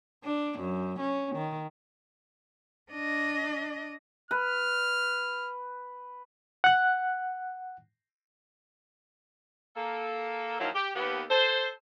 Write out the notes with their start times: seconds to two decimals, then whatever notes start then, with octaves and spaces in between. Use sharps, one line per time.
0.24 D4
0.59 F#2
0.99 C#4
1.35 D#3
2.92 D4 D#5
4.31 B4 F6
6.64 F#5 F#6
9.76 A#3 A4
10.60 D#3 F3 F#3 A#3 D#4 E4
10.75 G4
10.96 D#2 B3 G4
11.30 A4 C5